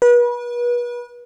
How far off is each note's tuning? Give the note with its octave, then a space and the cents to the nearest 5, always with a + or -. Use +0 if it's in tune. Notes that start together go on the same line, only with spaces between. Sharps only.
B4 -35